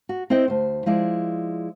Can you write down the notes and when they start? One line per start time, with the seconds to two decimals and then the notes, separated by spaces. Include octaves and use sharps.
0.09 F#4
0.30 C4 E4 D#5 G5
0.48 D2 C5
0.86 F3 G#3 E4 D5